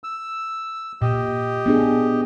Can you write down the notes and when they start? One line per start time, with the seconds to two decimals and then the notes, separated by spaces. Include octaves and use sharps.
0.04 E6
1.02 A#2 G4 D#5
1.66 B3 D4 G#4